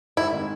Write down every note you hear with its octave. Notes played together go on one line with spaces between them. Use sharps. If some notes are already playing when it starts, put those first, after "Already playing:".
G#2 E4
D#3 G#3 C4